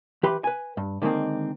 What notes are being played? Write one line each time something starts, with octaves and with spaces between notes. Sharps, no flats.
E3 G4 B4 B5 C6
B4 G#5
G2
D3 D#3 G#3 A#3 C4